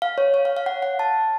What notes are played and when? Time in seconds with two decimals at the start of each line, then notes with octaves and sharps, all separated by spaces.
0.02 F5
0.18 C#5
0.34 C#5
0.45 F5
0.57 F5
0.66 F#5
0.82 F#5
0.99 A5